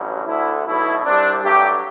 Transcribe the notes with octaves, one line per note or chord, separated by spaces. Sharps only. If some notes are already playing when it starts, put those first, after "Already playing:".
Already playing: A1 G2 F#3
D2 D3 A3 E4
B1 B2 A3 E4
C2 C3 G3 D4
G2 F#3 A3 G4